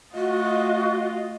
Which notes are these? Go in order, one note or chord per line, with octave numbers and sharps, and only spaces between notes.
A3 F4 F#4 D#5